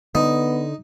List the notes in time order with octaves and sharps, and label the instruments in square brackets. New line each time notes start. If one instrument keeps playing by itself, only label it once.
[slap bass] D3 [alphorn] B3 [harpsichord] D#4